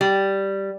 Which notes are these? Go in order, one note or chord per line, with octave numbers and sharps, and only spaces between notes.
G3